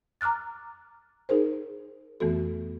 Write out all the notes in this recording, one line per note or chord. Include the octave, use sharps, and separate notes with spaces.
A#5 D6 F6 F#6 A6
D#4 G#4 A#4 C5
F2 E3 A3 B3 F#4 A4